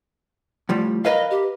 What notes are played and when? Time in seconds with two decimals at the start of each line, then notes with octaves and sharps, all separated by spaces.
0.69 A2 F3 G3
1.05 A#4 B4 D#5 F5
1.31 G4